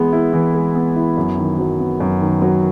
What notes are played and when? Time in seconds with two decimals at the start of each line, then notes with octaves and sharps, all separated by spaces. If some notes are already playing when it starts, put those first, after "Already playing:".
Already playing: E3 G#3 B3
0.13 E4
0.33 E3
0.54 G#3
0.75 B3
0.96 E4
1.17 F#2
1.38 D#3
1.58 F#3
1.80 B3
2.00 F#2
2.21 D#3
2.42 F#3